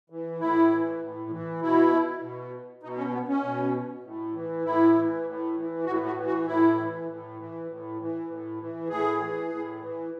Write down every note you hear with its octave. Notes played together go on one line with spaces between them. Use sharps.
E3
A2 E4
E3
A2
E3
B2 E4
B2
B2 D#4
C#4
B3
C#4
B2
A2
E3
A2 E4
E3
A2
E3
A2 F#4
F#4
E3
F#4
A2 E4
E3
A2
E3
A2
E3
A2
E3
A2 G#4
E3
A2
E3